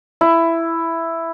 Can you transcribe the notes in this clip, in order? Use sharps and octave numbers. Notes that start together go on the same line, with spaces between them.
E4